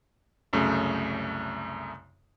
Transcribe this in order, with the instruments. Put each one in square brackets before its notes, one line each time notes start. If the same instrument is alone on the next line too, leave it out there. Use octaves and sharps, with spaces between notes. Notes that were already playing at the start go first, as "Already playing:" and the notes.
[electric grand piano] C2 F#2 C#3 A3